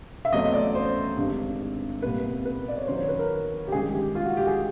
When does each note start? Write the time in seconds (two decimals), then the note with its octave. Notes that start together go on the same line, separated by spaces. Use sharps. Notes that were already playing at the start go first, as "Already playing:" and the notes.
0.25 E5
0.33 E2 C#3 F#3 A3 C4 D#5
0.54 D5
0.75 C5
1.17 G#1 G2 D3 G3
2.02 C2 A#2 G3 B3 B4
2.45 B4
2.68 D5
2.78 C#5
2.87 F#2 D#3 F#3 C5
2.99 C#5
3.09 B4
3.19 A#4
3.68 G4
3.72 G1 F#2 D#3 G#3 G#4
3.94 G4
4.15 F4
4.25 F#4
4.37 G4
4.47 G#4